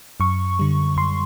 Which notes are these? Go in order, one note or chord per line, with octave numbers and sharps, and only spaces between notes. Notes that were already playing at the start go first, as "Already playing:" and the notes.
F#2 C#6
D3 G3
F#2 C6